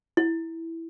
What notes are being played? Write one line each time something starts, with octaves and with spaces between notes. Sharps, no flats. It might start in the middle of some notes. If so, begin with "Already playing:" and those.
E4